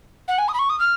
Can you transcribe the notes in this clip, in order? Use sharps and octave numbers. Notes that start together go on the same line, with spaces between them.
F#5
G#5
D#6
B5
C#6
D#6
F6